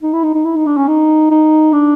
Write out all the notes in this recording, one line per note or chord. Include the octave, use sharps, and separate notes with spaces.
D#4
E4
D#4
D#4
E4
D#4
D4
C#4
D#4
D#4
D4